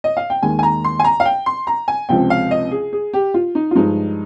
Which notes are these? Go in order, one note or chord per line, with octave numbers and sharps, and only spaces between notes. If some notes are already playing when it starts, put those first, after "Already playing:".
D#5
F5
G5
D#2 D#3 G#3 G#5
G#5
A#5
C6
G#5
A#5
F5
G5
C6
A#5
G#5
C#2 C3 F3 G#3 G5
F5
D#5
G#4
G#4
G4
F4
D#4
F4
G2 F3 G#3 D#4